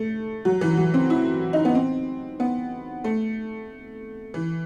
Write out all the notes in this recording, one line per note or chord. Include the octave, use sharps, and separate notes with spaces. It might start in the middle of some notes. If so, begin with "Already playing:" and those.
Already playing: A3
F#3
E3
F#3
C4
E4
D#4
B3
C4
B3
A3
E3